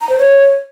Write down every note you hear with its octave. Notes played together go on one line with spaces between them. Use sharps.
A#5
C5
C#5